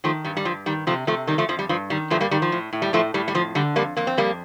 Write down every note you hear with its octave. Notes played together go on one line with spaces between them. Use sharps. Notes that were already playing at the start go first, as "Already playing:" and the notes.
D#3 F3 A3
G2 G3
G3
G2 F3
D#3 G3
C3 F3 A3
C3 F3 A3
D#3 G3
F3 A3
F2 F3
G3
G2 F3
D#3 G3
G2 F3 A3
G3 A#3
D#3 G3
F3
A2
A2
G3
A2 F3 A3
A2 G3
G3
F2 F3
D3 G3
F2 G3 A#3
F2 A#3
C4
F2 G3 A#3